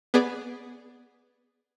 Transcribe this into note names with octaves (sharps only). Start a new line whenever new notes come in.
B3 G#4 D5